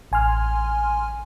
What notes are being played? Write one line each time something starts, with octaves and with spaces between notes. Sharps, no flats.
A1 G#5 C6 F6